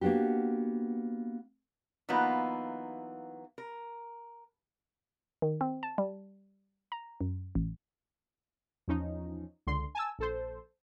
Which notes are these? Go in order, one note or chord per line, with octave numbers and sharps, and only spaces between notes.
A#3 B3 D4 F#4 G4
E3 F#3 A#3 B3 D#4 F4
A#4
D#3
C4
A5
G3
A#5
F#2
A1
E2 F3 C#4 D#4
C#2 D3 C6
G#5 A5 E6
A#1 A4 C5